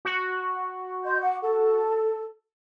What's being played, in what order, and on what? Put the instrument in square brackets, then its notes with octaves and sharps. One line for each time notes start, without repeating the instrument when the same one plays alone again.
[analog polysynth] F#4
[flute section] D#5 C6 G6
F#5 D6
A4